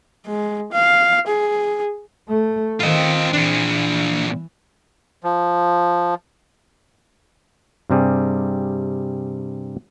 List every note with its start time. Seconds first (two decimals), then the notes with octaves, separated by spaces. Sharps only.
0.26 G#3
0.72 F5
1.27 G#4
2.29 A3
2.80 D#3 C4 F4 D#5
3.33 A#2 E3 D4
5.24 F3
7.90 G2 C3 G3 G#4